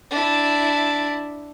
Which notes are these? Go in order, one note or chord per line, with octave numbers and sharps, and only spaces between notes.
D4 E4